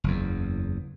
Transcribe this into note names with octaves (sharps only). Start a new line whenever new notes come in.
F#1 E2